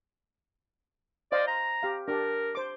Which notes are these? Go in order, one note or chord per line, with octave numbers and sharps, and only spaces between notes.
C5 D5 D#5 F5
A#5
G4 F5
D4 G4 A#4
C5 D6